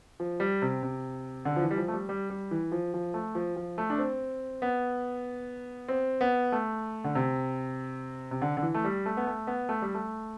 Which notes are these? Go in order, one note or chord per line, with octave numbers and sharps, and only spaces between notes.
F3
G3
C3
C3
D3
F3
E3
G3
F3
A3
G3
G3
G3
E3
F3
F3
A3
F3
F3
A3
D4
C4
B3
C4
B3
A3
D3
C3
C3
D3
D3
E3
A3
G3
A3
B3
A3
B3
A3
G3
A3